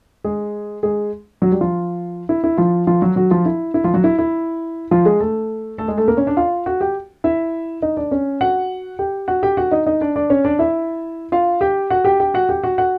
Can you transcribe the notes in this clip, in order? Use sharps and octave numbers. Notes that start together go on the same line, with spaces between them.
G#3 G#4
G#3 G#4
F#3 F#4
G3 G4
F3 F4
E4
E4
F3 F4
F3 F4
F#3 F#4
F#3 F#4
F3 F4
E4
E4
F3 F4
F#3 F#4
E4
E4
F3 F4
G#3 G#4
A3 A4
A3 A4
G#3 G#4
A3 A4
A#3 A#4
C#4 C#5
D4 D5
F4 F5
F#4 F#5
G4 G5
E4 E5
D#4 D#5
D4 D5
C#4 C#5
F#4 F#5
G4 G5
F#4 F#5
G4 G5
F#4 F#5
D#4 D#5
D#4 D#5
D4 D5
D4 D5
C#4 C#5
D4 D5
E4 E5
F4 F5
G4 G5
F#4 F#5
G4 G5
G4 G5
F#4 F#5
G4 G5
F#4 F#5
F#4 F#5